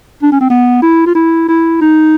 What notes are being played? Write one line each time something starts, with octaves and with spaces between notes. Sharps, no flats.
D4
C#4
C4
B3
E4
F4
E4
E4
D#4